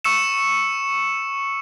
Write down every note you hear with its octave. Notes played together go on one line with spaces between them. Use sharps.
C#6 E6 C#7 E7